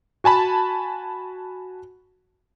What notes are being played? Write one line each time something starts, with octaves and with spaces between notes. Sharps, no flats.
F#4 G#5 A5 B5